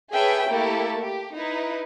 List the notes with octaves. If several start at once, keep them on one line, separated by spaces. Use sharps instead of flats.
G#4 A4 B4 C#5 E5 G5
A3 A#3 E4 G4 A4
G4
D#4 E4 B4